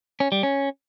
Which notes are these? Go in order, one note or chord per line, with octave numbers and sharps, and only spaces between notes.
C#4
G3
C#4